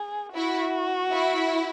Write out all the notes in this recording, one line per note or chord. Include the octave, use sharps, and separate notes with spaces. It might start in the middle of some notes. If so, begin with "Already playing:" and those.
Already playing: G#4
E4 F#4
E4